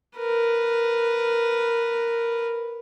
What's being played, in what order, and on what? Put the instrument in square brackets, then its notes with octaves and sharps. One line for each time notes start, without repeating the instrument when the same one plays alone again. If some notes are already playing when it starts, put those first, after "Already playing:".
[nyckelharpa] A#4 B4